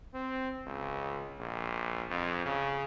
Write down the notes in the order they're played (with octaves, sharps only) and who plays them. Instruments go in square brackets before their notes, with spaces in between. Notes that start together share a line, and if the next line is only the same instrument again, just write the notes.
[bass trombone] C4
C#2
A#1
F2
C#3